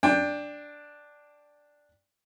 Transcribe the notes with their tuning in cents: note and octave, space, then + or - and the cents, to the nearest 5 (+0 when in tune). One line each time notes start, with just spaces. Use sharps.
D4 +0 G5 +20